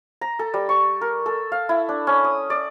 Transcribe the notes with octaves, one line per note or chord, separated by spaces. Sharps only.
A#5
A4
G3
C#6
A#4
A4
F5
E4
D4
C#4
D#6
D5